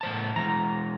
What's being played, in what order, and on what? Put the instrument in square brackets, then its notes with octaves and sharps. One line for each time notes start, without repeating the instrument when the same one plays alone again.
[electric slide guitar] A2 C5 A5
[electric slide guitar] E3 G#3 [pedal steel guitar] A#5